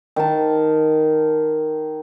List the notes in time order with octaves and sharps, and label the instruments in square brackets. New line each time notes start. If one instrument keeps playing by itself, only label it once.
[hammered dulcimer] D#3 A5